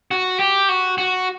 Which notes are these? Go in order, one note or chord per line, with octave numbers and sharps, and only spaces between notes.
F#4
G4
F#4
F#4